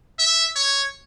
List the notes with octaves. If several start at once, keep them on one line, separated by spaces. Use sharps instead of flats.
E5
C#5